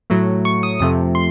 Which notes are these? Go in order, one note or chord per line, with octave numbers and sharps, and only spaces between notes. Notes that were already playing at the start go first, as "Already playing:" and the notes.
A2 F#3 A3
C#6
D#6
F2 C3 F3 A3 D#6
C6